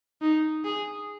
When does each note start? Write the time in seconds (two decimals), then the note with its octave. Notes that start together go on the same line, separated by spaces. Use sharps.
0.22 D#4
0.65 G#4